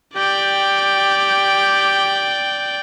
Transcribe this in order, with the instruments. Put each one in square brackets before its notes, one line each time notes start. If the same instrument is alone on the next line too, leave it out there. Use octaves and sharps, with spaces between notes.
[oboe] G4 [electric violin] D5 G5